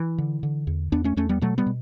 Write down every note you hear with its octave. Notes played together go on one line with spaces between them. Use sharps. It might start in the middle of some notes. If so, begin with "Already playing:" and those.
Already playing: E3
D3
D3
E2
E2 B3 D4
A3 C#4
E2 A3 C#4
G3 B3
B2 F#3 A3
G3 B3
B2